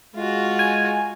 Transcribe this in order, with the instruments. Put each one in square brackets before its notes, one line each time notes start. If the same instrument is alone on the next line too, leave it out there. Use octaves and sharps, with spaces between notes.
[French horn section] G#3 [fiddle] F4 F#4
[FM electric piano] G#5